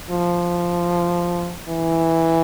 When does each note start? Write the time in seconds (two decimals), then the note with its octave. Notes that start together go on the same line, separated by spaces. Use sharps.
0.10 F3
1.68 E3